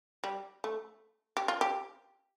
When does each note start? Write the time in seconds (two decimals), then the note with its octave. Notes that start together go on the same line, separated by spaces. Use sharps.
0.24 G3
0.64 A3
1.37 G4
1.48 F4
1.61 G4